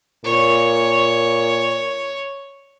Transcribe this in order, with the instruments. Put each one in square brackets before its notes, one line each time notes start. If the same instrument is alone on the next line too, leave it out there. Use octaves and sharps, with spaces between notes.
[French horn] A#2 [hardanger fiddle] C#5